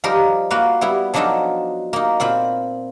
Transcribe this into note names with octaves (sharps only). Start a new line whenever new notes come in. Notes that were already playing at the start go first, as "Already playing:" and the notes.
F3 G3 D#4 G4 A#4
A#3 F#4 B4 F5
G3 B3 E4
F3 F#3 D4 D#4 F4 A4
A#3 D#4
A#2 C4 F4 B5